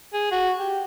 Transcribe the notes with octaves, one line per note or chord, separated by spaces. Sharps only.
G#4
F#4
G4